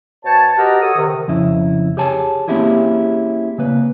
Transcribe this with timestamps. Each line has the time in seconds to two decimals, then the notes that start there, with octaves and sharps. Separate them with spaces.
0.24 B2 C5 C#5 A5
0.57 F#4 G4 A#4 B4 D#5 A#5
0.82 F#4 A4 C#5 D#6
0.97 C3 D#3
1.28 F2 C#3 E4
1.97 G4 G#4 C#5 G#5 A5
2.48 A#3 C4 C#4 E4 G4 G#4
3.58 C#3 A#3 B4